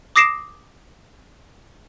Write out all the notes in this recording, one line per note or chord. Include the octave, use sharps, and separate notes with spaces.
D6 D#6 A#6 C7 D7 E7